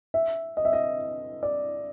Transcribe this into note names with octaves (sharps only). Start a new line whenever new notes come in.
E5
D#5
E5
D#5
D5